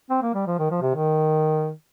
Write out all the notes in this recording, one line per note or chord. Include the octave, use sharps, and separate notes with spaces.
C4
A#3
G3
F3
D#3
F3
C3
D#3